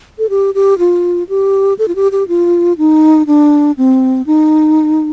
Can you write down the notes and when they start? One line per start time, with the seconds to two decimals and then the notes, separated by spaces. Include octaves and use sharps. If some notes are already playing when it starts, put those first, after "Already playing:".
0.19 A4
0.30 G4
0.55 G4
0.79 F4
1.29 G4
1.79 A4
1.88 F4
1.96 G4
2.12 G4
2.28 F4
2.78 D#4
3.27 D4
3.77 C4
4.26 D#4